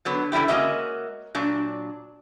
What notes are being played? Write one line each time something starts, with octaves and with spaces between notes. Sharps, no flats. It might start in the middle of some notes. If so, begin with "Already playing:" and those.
D3 F#3 B3
D3 E3 G3 E4 G4
G#3 A#3 C#4 F#4 D#5 E5
A#2 F#3 D4